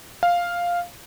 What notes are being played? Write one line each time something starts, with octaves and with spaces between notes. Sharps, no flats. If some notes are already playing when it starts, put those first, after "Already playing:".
F5